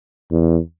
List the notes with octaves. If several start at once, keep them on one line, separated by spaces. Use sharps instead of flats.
E2